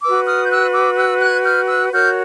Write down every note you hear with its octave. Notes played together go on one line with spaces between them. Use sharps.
F#4 B4 D6 E6
D#6 F6
G6
E6 F#6
D6 E6
E6 F#6
F#6 G#6
F6 G6
E6 F#6
F#4 A#4 C#5 F6 G6